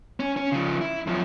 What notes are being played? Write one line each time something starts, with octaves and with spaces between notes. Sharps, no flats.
C#4
C#4
C#3 F3
E4
F#2 F3